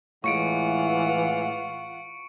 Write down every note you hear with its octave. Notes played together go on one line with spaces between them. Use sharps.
A2 E3 G#3 F4 F#5 C#6 C#7 D7